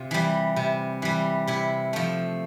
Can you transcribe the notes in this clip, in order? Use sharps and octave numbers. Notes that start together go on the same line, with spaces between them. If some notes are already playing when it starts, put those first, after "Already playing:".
Already playing: C3 F4
E3 G3
C3
E3 G3
C3 E4
F3 A3